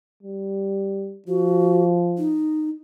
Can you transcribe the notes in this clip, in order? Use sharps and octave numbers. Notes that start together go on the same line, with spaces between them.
G3
F3 F#4
D#4